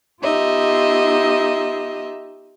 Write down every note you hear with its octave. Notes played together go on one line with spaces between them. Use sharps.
B3 D#4 F4 G4 D#5 E5